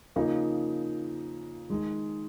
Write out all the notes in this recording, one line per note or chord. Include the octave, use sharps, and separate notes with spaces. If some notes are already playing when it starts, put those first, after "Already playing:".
C#3 F3 A#3 D#4
D#3 G#3 D#4